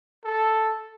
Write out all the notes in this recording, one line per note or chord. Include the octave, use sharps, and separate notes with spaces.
A4